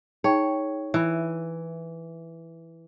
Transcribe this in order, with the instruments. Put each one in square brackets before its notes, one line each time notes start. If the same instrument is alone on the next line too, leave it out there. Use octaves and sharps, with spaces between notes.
[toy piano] D#4 G#4 G5 [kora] C#5
[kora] E3 [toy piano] E5 B5